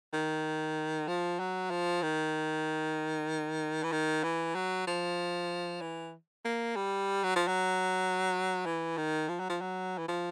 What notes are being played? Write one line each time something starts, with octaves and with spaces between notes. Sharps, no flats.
D#3
F3
F#3
F3
D#3
E3
D#3
E3
F#3
F3
E3
A#3
G3
F#3
F3
F#3
E3
D#3
F3
F#3
F3
F#3
E3
F3